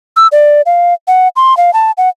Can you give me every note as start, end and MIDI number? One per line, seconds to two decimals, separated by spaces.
0.16 0.27 88
0.32 0.62 74
0.66 0.94 77
1.08 1.28 78
1.36 1.56 84
1.57 1.73 77
1.73 1.92 81
1.98 2.09 78